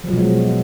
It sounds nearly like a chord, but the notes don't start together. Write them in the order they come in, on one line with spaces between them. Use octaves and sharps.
F3 F#3 B2 G#3